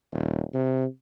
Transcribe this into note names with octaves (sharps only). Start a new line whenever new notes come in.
D#1
C3